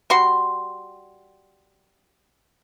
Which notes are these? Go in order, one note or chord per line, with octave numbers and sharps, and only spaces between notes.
G3 F#4 C6